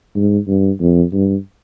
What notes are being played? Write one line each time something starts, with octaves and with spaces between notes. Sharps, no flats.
G#2
G2
F2
G2